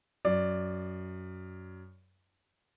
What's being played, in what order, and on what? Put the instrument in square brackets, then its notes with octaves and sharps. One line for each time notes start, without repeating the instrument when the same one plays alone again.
[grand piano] F#2 D5